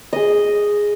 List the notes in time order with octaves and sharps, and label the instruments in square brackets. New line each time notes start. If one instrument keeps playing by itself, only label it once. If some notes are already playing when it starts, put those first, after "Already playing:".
[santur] G#4 D#5